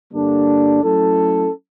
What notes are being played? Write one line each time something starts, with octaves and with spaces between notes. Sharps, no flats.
G2 D3 G3 A#3 D4
F#3 A3 C#4 E4 A4